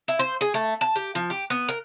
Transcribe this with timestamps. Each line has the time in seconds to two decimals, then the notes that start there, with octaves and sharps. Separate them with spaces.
0.08 E4
0.19 C5
0.41 G#4
0.54 A3
0.81 A5
0.96 G4
1.15 F3
1.30 G4
1.50 B3
1.69 A#4